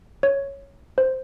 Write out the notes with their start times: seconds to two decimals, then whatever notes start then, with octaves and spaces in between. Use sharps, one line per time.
0.23 C#5
0.98 C5